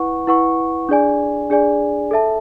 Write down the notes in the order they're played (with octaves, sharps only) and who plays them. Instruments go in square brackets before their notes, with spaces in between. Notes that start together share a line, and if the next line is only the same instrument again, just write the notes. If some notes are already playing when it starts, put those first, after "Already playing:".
Already playing: [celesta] E4 B4 F#5 C#6
E4 B4 F#5 C#6
D4 G#4 D5 G#5
D4 G#4 D5 G#5
A4 E5 A5